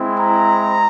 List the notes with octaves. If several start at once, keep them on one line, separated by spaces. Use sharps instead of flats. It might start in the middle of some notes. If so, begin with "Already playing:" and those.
Already playing: G#3 C4 E4
A#5